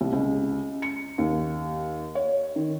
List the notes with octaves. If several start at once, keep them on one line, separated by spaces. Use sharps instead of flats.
C2
C#2
C#7
D#2
C#5
D#3